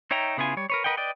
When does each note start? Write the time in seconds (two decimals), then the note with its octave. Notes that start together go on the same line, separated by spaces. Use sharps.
0.11 D#4 C#5 E5 G5 A#5
0.37 C#3 B3 E4 F4 G#5
0.57 G3 C#5
0.70 A#4 B4 C#5
0.84 A#4 B4 D#5 F#5 G5
0.97 B4 D5 D#5 G5